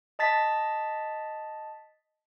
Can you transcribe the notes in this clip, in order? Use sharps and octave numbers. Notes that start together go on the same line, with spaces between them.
D#5 A5 A6 B6